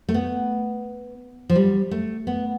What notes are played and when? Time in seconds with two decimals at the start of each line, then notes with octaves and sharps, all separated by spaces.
0.09 A3
0.14 B3
1.50 F3
1.56 G3
1.91 A3
2.27 B3